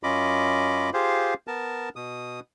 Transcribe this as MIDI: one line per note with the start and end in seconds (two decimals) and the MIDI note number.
0.03 0.90 42
0.03 0.90 61
0.03 0.90 65
0.03 0.90 75
0.03 0.90 83
0.03 0.90 86
0.93 1.34 65
0.93 1.34 67
0.93 1.34 68
0.93 1.34 72
0.93 1.34 77
1.47 1.89 59
1.47 1.89 70
1.47 1.89 81
1.96 2.40 47
1.96 2.40 87